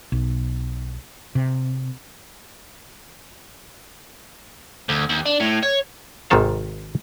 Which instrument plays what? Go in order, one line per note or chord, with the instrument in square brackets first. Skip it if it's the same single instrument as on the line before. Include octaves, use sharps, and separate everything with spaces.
[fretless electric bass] B1
C3
[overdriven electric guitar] D2
D#2
D4
A2
C#5
[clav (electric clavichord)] G#1 G#2 C3 D#3 A4 F5